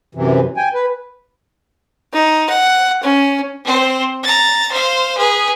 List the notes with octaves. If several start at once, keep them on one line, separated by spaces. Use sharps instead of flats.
F#2 C3 E3
G5 G#5
B4
D#4
F#5
C#4
C4 C5
A#5 A6
C5 F5
G#4 B4